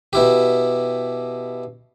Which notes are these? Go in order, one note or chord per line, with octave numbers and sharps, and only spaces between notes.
B2 E4 G4